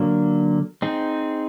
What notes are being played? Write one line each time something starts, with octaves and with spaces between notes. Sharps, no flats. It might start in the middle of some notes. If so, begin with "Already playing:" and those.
Already playing: D3 F#3 A#3
C4 D#4 G#4